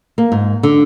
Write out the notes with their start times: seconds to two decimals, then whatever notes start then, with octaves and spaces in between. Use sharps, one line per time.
0.18 A#3
0.32 G#2
0.63 D3